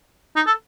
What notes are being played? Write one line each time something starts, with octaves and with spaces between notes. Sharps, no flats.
D#4
A4